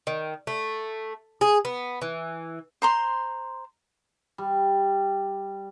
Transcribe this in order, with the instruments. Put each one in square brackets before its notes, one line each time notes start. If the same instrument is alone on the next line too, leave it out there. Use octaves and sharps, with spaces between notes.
[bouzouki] D#3
A3
G#4
B3
E3
[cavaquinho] C5 A#5 C6
[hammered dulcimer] G3